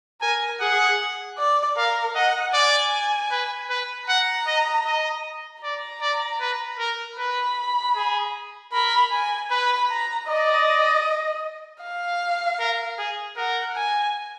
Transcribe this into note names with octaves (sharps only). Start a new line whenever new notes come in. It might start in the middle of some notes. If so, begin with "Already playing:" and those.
A#4 G#5
G#4 F#5
D5
A#4 F5
D#5 F#5
D5 G#5
B4
B4
F#5 A#5
D#5
D#5
D5 A#5
D5
B4
A#4
B4 B5
G#4
A#4 B5
G#5
B4 B5
A#5
D5 D#5
F5
A#4
G#4
A#4 F#5
G#5